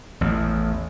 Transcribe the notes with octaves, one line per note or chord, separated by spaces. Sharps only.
A1 E2